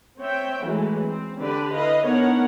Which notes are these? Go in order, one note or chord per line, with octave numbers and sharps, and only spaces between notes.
C4 C#5 E5 G5
E3 F#3 G#3 A3
C4
D3 D4 G4 B4 D5
E4 B4 D#5 F5
B3 D4 D#4 A#4 C#5 F#5